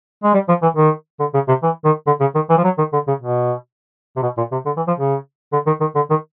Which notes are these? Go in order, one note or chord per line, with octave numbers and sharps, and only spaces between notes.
G#3
G3
F3
E3
D#3
D3
C#3
C3
E3
D#3
D3
C#3
D#3
E3
F3
F#3
D#3
D3
C#3
B2
C3
B2
A#2
C3
D3
E3
F3
C#3
D3
D#3
D#3
D3
D#3